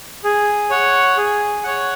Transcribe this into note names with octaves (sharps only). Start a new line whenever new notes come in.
G#4
C#5 F#5
G#4
C#5 F#5